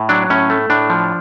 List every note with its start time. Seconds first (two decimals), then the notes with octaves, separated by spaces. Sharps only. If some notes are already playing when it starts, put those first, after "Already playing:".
Already playing: A2
0.09 F#3 D4
0.30 A2 C#4
0.50 A3
0.70 A2 D4
0.90 F3